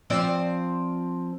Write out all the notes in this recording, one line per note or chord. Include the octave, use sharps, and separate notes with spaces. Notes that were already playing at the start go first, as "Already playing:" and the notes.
F3 C4 D5